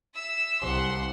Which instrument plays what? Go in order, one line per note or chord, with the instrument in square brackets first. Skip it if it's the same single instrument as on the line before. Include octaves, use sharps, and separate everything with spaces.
[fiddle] E5 E6
[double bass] C2 [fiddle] F#5 C6